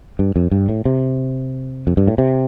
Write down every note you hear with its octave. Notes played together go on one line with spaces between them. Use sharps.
G2
F2
G2
A2
C3
F2
G2
A2
C3